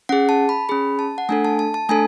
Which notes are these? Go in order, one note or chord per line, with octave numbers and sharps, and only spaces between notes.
C#4 G#4 F#5
A5
B5
C#4 G#4 B5
A5
F#5
A3 D4 A4 G#5
A5
A5
A5
A3 D4 A4 G#5